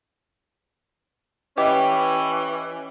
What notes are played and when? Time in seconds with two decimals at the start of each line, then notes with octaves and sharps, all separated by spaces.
1.57 E3 C#4 E4 G4 B4 D#5 D6